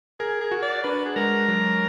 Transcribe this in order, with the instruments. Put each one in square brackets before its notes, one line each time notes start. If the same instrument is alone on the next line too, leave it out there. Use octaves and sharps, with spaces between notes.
[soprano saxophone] G#4 [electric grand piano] A#4
[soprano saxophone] G#4
[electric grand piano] F#4
[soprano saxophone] D5
[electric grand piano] D4 [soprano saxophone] B4
[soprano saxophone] G#4
[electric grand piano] G#3 [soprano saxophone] A#4
[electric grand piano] F#3